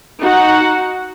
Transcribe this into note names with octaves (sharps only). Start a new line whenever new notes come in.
D#4 F#4 F#5